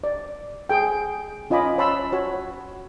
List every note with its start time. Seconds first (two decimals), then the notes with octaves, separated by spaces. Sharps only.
0.04 D5
0.69 G#4 G5
1.50 C#4 F4 D#5 G#5 B5 D6
1.78 C#5 A5 B5 C6 E6
2.12 F#4 C#5